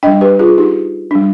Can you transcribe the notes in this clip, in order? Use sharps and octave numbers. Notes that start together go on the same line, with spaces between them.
G3 D4 D#5 G5
G4 B4
F4 G#4
D#4 G4
G3 D4